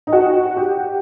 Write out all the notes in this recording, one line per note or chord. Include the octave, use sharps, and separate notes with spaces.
D#4
F#4
G4